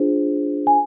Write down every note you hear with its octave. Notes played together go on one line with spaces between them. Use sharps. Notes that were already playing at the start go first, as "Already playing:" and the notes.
Already playing: D4 F4 G#4 C5
G#5